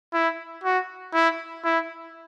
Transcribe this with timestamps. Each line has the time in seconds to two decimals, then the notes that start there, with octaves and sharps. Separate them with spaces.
0.14 E4
0.64 F#4
1.14 E4
1.64 E4